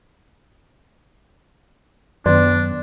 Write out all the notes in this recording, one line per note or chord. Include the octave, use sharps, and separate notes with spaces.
F#2 D#3 B3 D4 D5